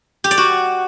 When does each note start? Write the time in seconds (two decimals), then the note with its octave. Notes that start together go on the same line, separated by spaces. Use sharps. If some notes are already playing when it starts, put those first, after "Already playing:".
0.24 G4
0.31 D5
0.38 F#4